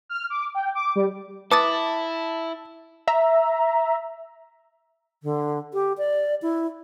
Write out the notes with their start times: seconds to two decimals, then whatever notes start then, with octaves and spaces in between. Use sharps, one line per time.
0.09 F6
0.30 D6
0.55 G5
0.75 D6
0.95 G3
1.51 E4 B4 A5 D6 D#6 A6
3.08 E5 A#5
5.23 D3
5.73 G4
5.98 D5
6.42 E4